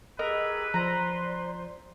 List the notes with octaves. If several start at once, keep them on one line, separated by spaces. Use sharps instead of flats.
G4 G#4 A#4 B4 D#5 E6
F3 C5 D5 A#5 C6